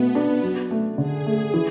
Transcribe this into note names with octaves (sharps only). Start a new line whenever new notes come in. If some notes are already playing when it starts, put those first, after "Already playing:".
Already playing: B2 A3 B3
D4
F#3
A3
D3 G#4
A3
E3